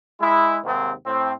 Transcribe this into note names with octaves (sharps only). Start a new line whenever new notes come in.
G#3 E4
D#2 G#2 C3 D#3 C4
A2 C4